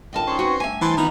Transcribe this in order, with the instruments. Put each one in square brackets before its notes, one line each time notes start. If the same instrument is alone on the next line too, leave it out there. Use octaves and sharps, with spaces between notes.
[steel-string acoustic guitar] G#2 D3 A5 [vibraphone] F4 A#4 G5
[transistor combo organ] C#4 C5 [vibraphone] D#4 G5 A#5
[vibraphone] C4 B4 [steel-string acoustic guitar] F#4
[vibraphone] G3 A3 D4 [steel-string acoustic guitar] E5 G#5
[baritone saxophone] E3 [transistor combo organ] C5 A5
[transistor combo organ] D#3 B3 [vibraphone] D4 F4 F#5 [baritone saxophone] D#4